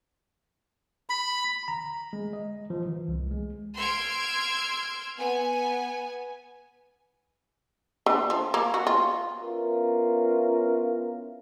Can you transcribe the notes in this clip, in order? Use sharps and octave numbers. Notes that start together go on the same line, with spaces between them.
B5
A#5
G#3
D#5
F3
E3
C2
G#3
C6 E6 F6 G#6 D7
B3 G#5
D3
F3
A#3
F#4
F4
B3 C#4 E4 F4 A#4